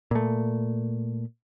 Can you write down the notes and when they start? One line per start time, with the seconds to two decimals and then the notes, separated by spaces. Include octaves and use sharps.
0.11 A#2 A3